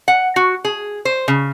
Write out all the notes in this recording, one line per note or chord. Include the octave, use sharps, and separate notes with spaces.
F#5
F#4
G#4
C5
C#3